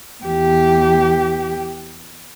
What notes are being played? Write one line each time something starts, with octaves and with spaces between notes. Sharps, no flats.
E2 G4